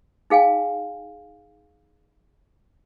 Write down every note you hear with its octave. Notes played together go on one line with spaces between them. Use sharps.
D#4 G#4 F5 G5 G#5